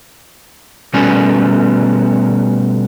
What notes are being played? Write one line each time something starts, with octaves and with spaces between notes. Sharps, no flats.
B2 G3 A3 B3 C#4